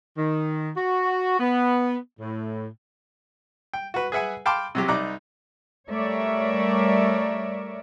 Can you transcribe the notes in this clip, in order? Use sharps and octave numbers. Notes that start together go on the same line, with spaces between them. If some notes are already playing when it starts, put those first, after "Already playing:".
D#3
F#4
B3
A2
G5
F#4 B4
G#4 B4 E5 F#5 G#5
F5 G5 A5 B5 C6 D6
C3 F#3 G4
C2 D#4 D5 A#5 D6 F#6
G3 A3 A#4 C#5 D5 E5